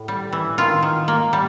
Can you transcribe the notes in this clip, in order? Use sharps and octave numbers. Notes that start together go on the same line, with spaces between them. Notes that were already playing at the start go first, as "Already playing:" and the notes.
Already playing: A2
G3
E3
D#3 F4
D#3
A#3
G3